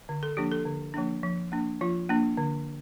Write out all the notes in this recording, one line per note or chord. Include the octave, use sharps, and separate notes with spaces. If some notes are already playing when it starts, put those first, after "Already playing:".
D3
A4
F3 A#3 D4 G4
A4
D3
F3 A#3 D4
F3
A#3 D4
F3 F4
A#3 D4
D3